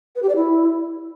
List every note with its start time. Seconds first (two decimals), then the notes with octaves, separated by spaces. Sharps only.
0.16 B4
0.22 G4
0.29 D5
0.36 E4